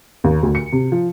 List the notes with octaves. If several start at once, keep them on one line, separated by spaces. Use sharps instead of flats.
D#2
D2
C#7
C3
F3